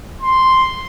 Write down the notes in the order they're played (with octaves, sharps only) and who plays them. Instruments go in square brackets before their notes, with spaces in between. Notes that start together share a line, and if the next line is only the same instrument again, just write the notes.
[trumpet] C6